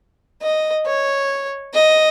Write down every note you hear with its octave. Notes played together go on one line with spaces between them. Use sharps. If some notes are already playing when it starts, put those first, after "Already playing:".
D#5
C#5
D#5